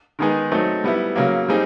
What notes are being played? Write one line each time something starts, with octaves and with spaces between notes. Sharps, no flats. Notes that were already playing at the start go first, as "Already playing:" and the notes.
D#3 G#3 B3 D#4 G#4
F#3 A3 C4 D#4
G3 B3 E4
C#3 F#3 A#3
G3 C4 D#4 G#4